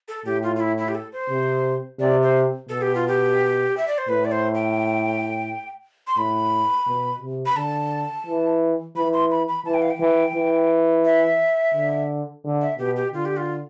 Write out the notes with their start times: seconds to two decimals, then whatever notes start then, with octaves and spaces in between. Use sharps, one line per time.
0.08 A4
0.26 A2 G4
0.43 F4
0.56 F4
0.60 E4
0.78 E4
0.88 G4
0.95 A4
1.12 C5
1.30 C3
1.99 C3 D5
2.23 C5
2.69 B2 A4
2.82 G4
2.95 F4
3.08 G4
3.77 E5
3.88 D5
3.98 C5
4.09 A2 B4
4.25 D5
4.32 C5
4.55 G5
6.07 C6
6.17 A2 B5
6.87 B2
7.21 C3
7.46 B5
7.56 D3 A5
8.27 E3
8.96 E3 B5
9.13 C6
9.31 B5
9.48 B5
9.65 E3 A5
9.74 G5
9.82 F5
9.90 G5
10.00 E3
10.35 E3
11.05 E5
11.74 D3
12.44 D3
12.61 E5
12.79 B2 G4
12.96 G4
13.13 D3 F4
13.25 G4
13.37 F4